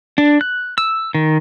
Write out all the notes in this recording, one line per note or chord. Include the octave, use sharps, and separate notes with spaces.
D4
F#6
E6
D#3